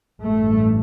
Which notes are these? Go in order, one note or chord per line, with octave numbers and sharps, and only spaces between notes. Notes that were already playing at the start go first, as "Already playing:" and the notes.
A1 G2 A3